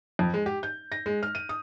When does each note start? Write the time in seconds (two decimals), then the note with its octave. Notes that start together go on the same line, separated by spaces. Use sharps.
0.19 F2
0.34 G#3
0.46 G4
0.63 G6
0.92 A#6
1.06 G#3
1.23 F6
1.35 D#7
1.49 D#6